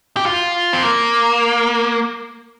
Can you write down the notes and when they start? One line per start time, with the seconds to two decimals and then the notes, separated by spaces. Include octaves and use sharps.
0.17 G4
0.26 F4
0.73 C4
0.82 A#3